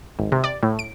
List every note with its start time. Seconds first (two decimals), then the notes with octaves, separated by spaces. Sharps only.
0.19 G#1
0.32 C3
0.44 D5
0.63 A2
0.79 D7